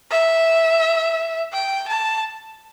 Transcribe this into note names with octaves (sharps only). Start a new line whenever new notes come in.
E5
G5
A5